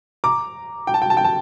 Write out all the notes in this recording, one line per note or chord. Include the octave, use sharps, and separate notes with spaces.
A#5 D6
G5
A5
G5
A5
G5
A5